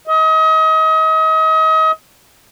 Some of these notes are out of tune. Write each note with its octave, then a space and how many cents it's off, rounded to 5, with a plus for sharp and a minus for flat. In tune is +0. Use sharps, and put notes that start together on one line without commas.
D#5 +35